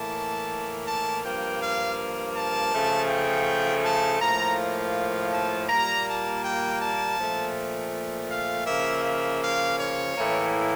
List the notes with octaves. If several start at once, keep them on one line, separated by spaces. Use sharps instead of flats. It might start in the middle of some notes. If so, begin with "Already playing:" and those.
Already playing: A2 E3 A#3 A5
A5
G2 F3 A#3 G5
F5
A5
C#3 F3 A3
G5
A5
A2 F3 A#3 A#5
A5
A#2 G3 A#3 A#5
A5
G5
A5
A#2 F3 A3
F5
C#3 F3 A#3 E5
E5
F5
C#5
A2 E3 A#3